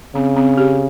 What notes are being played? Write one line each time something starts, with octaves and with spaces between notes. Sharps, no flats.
C#3 C4
C4
G4